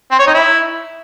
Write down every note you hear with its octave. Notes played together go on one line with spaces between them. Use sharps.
C4
C#5
D#4
E4